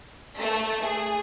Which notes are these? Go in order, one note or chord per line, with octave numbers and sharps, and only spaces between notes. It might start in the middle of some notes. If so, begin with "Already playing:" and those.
A3
G#4